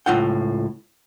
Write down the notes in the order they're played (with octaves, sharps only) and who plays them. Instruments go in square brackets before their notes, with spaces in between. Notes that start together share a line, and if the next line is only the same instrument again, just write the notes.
[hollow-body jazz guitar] C#2 A2 F4 F#5 G5